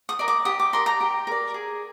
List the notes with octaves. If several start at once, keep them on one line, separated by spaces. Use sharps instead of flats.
D#6
A#4 D5
D6
G4 D#6
D6
A#4 D5 C6
A#5
G4
A#4 D5
G#4